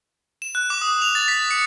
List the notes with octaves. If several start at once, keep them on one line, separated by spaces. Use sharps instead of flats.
E7
F#6
D6
D#6
F7
A6
B6
C#7